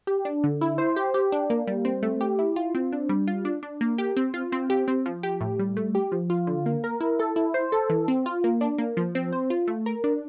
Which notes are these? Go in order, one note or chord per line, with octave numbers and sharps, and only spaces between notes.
G4
D4
D3
E4
C5
G4
G4
D4
A#3
G3
C4
A3
G4
E4
F4
C4
D4
G3
F4
D4
D4
A#3
G4
C4
F4
C4
G4
C4
F3
G4
A2
G3
A3
G4
F3
F4
D3
A#3
A#4
E4
A4
E4
C5
A4
E3
C4
F4
A#3
D4
A#3
F3
C4
C5
F4
A3
A#4
D4